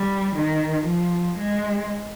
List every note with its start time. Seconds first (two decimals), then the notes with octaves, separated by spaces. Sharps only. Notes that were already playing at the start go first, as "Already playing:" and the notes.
Already playing: G3
0.36 D#3
0.86 F3
1.38 G#3